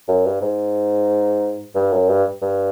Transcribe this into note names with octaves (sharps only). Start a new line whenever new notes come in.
F#2
G2
G#2
G2
F#2
G2
G2